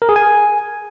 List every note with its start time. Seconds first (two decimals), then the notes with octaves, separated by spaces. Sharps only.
0.02 A#4
0.09 G#4
0.16 G#5